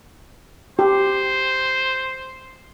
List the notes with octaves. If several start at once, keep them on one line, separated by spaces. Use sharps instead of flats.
G4 C5